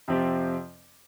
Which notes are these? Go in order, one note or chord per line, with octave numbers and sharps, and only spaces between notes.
F2 C3 F3 C4 G4